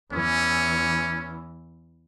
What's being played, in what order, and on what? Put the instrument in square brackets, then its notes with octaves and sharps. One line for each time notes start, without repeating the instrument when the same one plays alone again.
[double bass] E2 E3 [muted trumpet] C#4